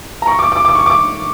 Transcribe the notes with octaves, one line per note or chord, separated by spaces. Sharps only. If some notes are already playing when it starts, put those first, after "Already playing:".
A#5
C#6
D6
D6
D6
C#6
D6